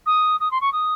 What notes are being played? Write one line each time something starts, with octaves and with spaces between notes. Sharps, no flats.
D#6
D#6
C6
C#6
D#6